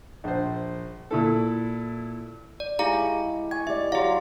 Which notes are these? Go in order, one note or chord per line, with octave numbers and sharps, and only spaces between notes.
A#1 C5
A#2 E4 A4
D5
G#3 E4 G4 G#4 F5 A#5
D#5 G#5 C#6 G#6
E4 G4 D5 E5
F#3 G4 F5 A#5 C6